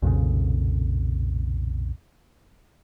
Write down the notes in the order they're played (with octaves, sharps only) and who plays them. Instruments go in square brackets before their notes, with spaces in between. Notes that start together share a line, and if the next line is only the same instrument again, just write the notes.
[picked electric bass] B1 F2 A#2 C#3